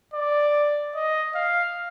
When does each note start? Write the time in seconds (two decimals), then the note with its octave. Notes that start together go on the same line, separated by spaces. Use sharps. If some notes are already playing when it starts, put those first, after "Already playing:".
0.14 D5
0.95 D#5
1.35 F5